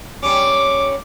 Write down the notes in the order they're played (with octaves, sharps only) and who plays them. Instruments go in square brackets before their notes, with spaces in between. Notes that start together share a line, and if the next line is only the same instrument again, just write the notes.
[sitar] G3 C#4 [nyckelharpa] D6